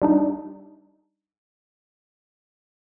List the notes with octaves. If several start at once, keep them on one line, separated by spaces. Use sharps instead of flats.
G3 D4 D#4